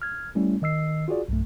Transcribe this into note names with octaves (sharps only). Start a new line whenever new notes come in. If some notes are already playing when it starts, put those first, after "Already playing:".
F6 G#6
G3 A3 C#4 E4
D#3 D#5 E6 C7
F4 F#4 G#4 D5
B1 G2 A3